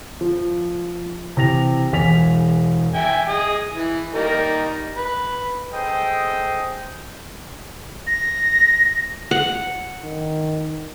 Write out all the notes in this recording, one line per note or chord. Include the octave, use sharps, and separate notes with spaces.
F3
C3 E3 A#6 F7
E1 E2 G#5 B6 F7
E5 G5 G#5
G#4 D#5 D#6
E3
G3 A#3 D#4
B4
G#4 A4 C5 D#5 G5
A#6
F#5
D#3